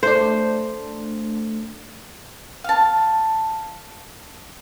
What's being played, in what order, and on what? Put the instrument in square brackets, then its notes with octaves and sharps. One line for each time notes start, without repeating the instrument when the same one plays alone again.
[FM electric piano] A3 D4 [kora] C5
[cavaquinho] F5 A5